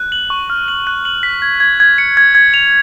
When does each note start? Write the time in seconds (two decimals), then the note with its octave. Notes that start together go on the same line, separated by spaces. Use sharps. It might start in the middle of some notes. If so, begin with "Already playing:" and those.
Already playing: F#6
0.12 F#7
0.30 C#6
0.50 F6
0.68 F#7
0.87 F#6
1.05 F#7
1.23 B6
1.42 G#6
1.60 G#6
1.80 G#6
1.98 C#7
2.17 G#6
2.35 G#6
2.54 F7